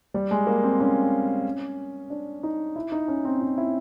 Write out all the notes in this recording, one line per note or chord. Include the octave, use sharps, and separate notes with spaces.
G3
G#3
A#3
C4
C#4
D4
D#4
E4
D#4
C#4
C4
D#4
E4